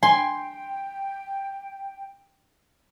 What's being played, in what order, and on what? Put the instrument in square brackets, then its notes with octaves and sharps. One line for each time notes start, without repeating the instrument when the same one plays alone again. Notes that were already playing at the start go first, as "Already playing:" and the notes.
[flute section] G5 [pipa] G#5 [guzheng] C6